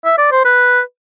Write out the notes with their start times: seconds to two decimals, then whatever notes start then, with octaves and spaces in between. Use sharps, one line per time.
0.05 E5
0.18 D5
0.32 C5
0.45 B4